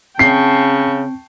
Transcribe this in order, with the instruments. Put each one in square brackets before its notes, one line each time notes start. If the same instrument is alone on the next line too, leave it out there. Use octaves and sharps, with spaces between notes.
[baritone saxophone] C#3 [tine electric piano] C4 [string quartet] G5 A5 C#6 [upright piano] C7